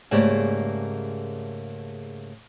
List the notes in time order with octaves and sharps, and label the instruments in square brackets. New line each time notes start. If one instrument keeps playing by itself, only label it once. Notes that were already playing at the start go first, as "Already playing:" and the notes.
[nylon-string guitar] G#2 C#3 A3 A#3 G4 D5